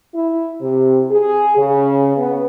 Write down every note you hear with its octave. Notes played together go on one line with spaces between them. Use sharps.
E4
C3
G#4
C#3
B3